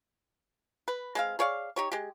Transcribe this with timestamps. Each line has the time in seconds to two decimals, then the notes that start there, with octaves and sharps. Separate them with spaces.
0.88 B4
1.15 G#3 C4 F5
1.39 G#4 C#5 D5 F5
1.76 D#4 G4 C#5
1.92 G#3 G4